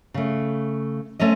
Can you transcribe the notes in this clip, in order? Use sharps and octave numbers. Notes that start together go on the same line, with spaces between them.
C#3 A3
A3 C4 C#4 D#5